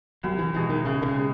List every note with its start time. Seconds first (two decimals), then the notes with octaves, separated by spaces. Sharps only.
0.23 C2 F#3
0.38 E3
0.54 B2 E3 G#3
0.69 D#3
0.85 C2 C#3
1.02 D3
1.06 C#3
1.16 G#3